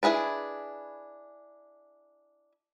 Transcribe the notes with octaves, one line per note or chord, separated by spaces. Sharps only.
D4 E4 G#4 B4 D5